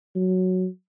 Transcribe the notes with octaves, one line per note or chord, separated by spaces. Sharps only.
F#3